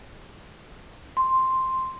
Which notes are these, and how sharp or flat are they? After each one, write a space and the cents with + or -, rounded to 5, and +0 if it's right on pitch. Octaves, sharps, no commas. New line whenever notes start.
C6 +0